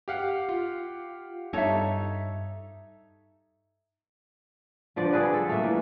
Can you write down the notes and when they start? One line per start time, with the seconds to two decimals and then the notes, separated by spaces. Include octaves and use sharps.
0.08 G4 F5 F#5
0.49 F4
1.53 G2 D#4 A4 C#5 E5
4.96 D3 F3 B4 D5
5.12 G#4 A4 B4 D5
5.33 A4
5.49 A3 A#3
5.63 E3